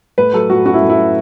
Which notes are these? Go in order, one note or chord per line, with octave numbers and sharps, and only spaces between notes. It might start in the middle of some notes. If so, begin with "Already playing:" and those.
A2 B4
F#3 A4
A2 F#4
C#4 F#4
E4
A2
E4
F#3